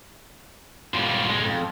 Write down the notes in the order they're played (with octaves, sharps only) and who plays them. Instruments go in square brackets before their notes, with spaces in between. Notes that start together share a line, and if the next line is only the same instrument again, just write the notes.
[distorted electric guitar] G#2 B2 [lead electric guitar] G3 F4
[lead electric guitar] G#3
F2